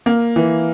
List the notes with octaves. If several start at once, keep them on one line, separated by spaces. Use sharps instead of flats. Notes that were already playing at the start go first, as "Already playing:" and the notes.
A#3
E3